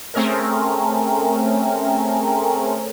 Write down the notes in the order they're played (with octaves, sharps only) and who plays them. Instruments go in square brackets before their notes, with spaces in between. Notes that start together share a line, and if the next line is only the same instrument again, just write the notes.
[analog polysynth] A3 C4 C#4 G#4 A#4